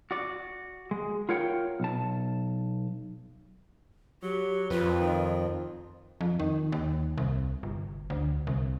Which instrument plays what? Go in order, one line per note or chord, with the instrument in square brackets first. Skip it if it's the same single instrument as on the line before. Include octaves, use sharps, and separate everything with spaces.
[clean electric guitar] F#4 D5
G#3
F4 A#4 C#5 F#5 G5
B1 A5
[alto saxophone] F#3 [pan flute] G4
[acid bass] F2 [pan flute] F4 [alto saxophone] B4
[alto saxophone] D#3
[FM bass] F2
D#3
D#2
C2
G1
D2
C2